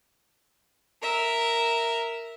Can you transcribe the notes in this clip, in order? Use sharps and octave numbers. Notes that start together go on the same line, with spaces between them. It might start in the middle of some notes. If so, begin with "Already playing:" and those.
A#4 E5